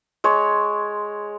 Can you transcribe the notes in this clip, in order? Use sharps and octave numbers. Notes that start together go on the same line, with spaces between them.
G#3 C#5